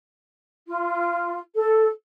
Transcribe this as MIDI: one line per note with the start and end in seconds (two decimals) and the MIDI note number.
0.67 1.39 65
1.54 1.89 69